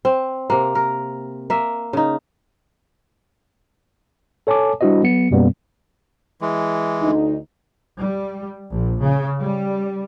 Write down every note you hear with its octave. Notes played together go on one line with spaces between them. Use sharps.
C4
C3 A#3
A#4
A#3 E5
C#3 D#4
A4 C#5 G#5 A5 D6
G3 D4 E4 F#4 C5 D#5
F#3 B3 C#7
F#2 B2 G3 A#3 B3 C#4
E3 G#3
D2 D3 D#4
G3
A#1
C#3
G3